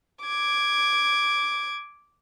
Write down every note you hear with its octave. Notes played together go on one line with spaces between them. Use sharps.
D6 G#6